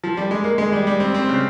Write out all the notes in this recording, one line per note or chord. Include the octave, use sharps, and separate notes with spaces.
F3
G3
G#3
A#3
G#3
G3
G3
C4
C4
C#3